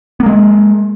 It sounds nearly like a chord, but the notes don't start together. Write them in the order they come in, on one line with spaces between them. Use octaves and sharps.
B3 A#3 G#3